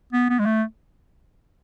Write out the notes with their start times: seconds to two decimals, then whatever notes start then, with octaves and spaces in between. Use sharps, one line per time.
0.13 B3
0.29 B3
0.39 G#3
0.45 A3